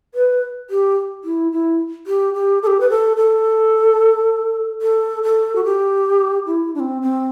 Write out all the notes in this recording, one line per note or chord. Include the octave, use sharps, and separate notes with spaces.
B4
G4
E4
E4
G4
G4
A4
G4
B4
A4
A4
A4
A4
F#4
G4
E4
D4
C4
C4